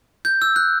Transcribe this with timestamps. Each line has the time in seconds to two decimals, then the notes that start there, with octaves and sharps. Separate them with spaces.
0.25 G6
0.42 E6
0.56 F#6